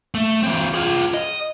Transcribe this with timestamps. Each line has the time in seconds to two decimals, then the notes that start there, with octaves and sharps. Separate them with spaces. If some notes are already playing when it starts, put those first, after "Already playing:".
0.14 A3
0.43 E3 C4
0.74 F4 G#4
1.14 D#5